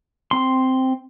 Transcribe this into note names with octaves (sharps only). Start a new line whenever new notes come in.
C4 C6